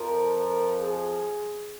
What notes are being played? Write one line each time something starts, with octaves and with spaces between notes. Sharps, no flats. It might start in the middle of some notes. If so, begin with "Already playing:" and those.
Already playing: F2 F3 A#4
A#4
G#4